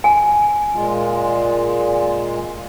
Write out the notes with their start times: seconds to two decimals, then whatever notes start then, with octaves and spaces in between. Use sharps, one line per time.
0.04 G#5
0.74 A#2 G#3 F4